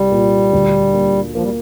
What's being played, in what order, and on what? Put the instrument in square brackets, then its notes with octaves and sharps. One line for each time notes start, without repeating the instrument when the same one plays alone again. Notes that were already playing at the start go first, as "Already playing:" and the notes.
Already playing: [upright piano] C2 [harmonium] G3
[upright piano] A#2
D2
A#3
[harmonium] F3 [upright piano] A#3
[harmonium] G3